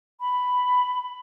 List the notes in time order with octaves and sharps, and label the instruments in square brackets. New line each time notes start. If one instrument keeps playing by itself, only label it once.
[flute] B5